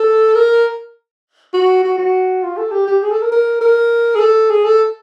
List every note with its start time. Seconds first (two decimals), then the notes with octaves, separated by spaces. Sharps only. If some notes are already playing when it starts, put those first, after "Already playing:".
Already playing: A4
0.35 A#4
1.53 F#4
1.83 F#4
1.98 F#4
2.43 F4
2.57 A4
2.72 G4
2.87 G4
3.02 G#4
3.12 A4
3.21 A#4
3.32 A#4
3.61 A#4
4.15 G#4
4.21 A4
4.50 G#4
4.65 A4